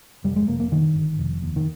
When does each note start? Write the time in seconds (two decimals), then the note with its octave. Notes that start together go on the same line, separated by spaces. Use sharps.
0.24 F1 G3
0.36 G#3
0.48 F1 A#3
0.60 A#3
0.72 G2 D#3
0.95 G1
1.19 F1
1.42 D#2
1.56 D#3